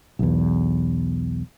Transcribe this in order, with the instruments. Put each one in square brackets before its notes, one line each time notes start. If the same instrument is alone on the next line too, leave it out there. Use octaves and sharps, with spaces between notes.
[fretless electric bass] B1 E2